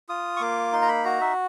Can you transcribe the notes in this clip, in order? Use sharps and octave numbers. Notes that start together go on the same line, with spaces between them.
F4 D#6
C#6
A#3 D6
D#4 C6
A#5
B5
F#4 A#5
E5